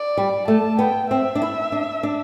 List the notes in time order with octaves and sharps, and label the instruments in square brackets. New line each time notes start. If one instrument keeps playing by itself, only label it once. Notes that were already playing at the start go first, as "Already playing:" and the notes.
Already playing: [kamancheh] D5
[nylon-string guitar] G3
[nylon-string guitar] A3 [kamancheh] A5
[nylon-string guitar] B3 [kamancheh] G5
[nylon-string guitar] C4 [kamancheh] E5
[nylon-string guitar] D4
E4
D4
D4